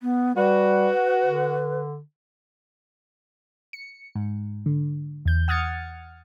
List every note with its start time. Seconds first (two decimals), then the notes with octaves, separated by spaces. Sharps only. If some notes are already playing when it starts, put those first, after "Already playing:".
0.01 B3
0.36 G3 F#4 B4
1.24 D3
3.73 C#7
4.15 G#2
4.66 D3
5.25 E2 G6
5.48 F#5 D#6 F6 G#6 A6 C#7